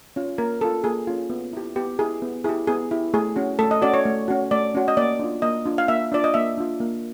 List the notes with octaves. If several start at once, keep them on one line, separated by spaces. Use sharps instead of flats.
C#4 F4
A#3 A#4
C#4 F4 A4
A#3 G#4
C#4 F4
B3
E4 G4
B3 G4
E4 G4 G#4
B3
E4 G4 G#4
B3 G#4
E4 G4
A3 G#4
C#4 F#4
A3 A4
D#5
C#4 F#4 D5
C#5
A3
C#4 F#4
A3 D5
C#4 F#4
D#5
A#3 D5
D4 F4
A#3 D#5
D4 F4
F5
A#3 E5
D4 F4 D5
D#5
A#3 E5
D4 F4
A#3